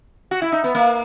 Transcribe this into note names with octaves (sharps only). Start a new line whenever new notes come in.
F#4
E4
D#4
B3
A#3